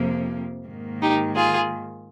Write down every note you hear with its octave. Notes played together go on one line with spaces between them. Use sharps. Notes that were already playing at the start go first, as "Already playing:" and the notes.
Already playing: F2 C3 F3 A#3
G#2 D#3 A#3
D#4 G4
F4 G#4